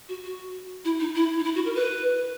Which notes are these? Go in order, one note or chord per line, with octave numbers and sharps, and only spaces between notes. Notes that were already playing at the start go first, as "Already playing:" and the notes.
F#4
F#4
E4
D#4
E4
D#4
E4
F#4
A#4
B4